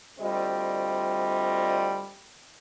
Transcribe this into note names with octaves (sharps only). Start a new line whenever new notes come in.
D2 G3 C4 F4 D#5